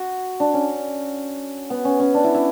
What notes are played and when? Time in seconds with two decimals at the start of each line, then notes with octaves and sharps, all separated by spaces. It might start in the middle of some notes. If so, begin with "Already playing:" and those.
Already playing: F#4
0.40 D4
0.54 C#4
1.70 B3
1.85 C#4
2.00 C#4
2.14 D4
2.24 E4
2.35 E4